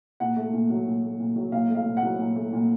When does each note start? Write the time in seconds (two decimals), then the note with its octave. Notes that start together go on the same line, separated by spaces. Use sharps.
0.20 A#2 F#5
0.36 A3
0.53 A#2
0.70 F#3
0.87 A#2
1.04 A3
1.20 A#2
1.36 F#3
1.52 A#2 F5
1.69 A3
1.75 F5
1.86 A#2
1.97 F#5
2.03 F#3
2.18 A#2
2.36 A3
2.53 A#2